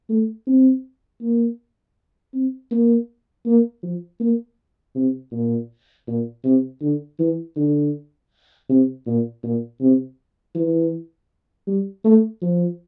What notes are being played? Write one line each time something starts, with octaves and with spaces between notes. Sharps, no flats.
A3
C4
A#3
C4
A#3
A#3
F3
A#3
C3
A#2
A#2
C3
D3
E3
D3
C3
A#2
A#2
C3
E3
G3
A3
F3